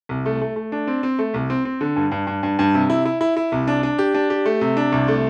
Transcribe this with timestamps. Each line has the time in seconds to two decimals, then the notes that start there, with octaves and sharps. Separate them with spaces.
0.09 C2
0.26 A3
0.41 A3
0.56 A3
0.72 D4
0.87 C4
1.03 C4
1.19 A3
1.34 C2
1.50 C4
1.65 C4
1.81 D3
1.96 G2
2.12 G2
2.27 G2
2.43 G2
2.59 G2
2.74 C3
2.90 E4
3.05 E4
3.21 E4
3.37 E4
3.52 C2
3.67 D4
3.83 D4
3.99 G4
4.14 D4
4.30 G4
4.46 A3
4.61 C3
4.77 D4
4.92 C2
5.08 A3